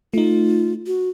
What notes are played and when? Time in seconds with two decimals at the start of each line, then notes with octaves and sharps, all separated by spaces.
0.14 A3 D#4 F4
0.87 F#4